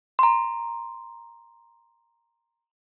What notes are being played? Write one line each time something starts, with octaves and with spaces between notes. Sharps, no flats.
A#5 C6